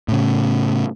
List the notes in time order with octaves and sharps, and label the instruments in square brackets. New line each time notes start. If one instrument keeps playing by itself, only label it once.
[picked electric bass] A2 C#3